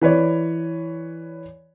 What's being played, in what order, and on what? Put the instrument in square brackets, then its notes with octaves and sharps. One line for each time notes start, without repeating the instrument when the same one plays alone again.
[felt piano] E3 B4 C#5 D5